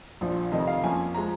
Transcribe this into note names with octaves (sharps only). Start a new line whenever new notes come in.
A#1 A#2 F3
F1 F2 D#3 D#5
F5
F2 F3 A#3 C#4 G#5
F3 G#3 A#5